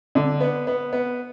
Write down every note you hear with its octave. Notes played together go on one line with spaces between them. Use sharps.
D3
B3
B3
B3